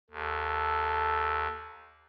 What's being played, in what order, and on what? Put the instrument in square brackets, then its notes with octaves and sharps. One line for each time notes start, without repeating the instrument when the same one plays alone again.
[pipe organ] D#2 [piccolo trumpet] A4